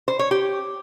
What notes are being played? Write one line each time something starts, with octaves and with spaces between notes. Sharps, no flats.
C5
C#5
G4